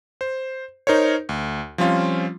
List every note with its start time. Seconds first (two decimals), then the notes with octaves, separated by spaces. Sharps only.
0.21 C5
0.87 D#4 A#4 C5 C#5
1.29 D2
1.78 F3 G3 C4 C#4 F4